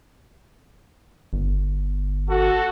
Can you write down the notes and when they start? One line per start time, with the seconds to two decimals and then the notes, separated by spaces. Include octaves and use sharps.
1.33 G1
2.30 F#4 A4